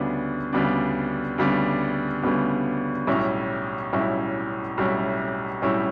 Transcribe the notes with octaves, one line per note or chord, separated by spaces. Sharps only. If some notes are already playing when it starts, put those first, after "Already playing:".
Already playing: D2 C#3 G3 B3 D4
D2 C#3 G3 B3 D4
D2 C#3 G3 B3 D4
D2 C#3 G3 B3 D4
B1 A2 G3 C#4 E4
B1 A2 G3 C#4 E4
B1 A2 G3 C#4 E4
B1 A2 G3 C#4 E4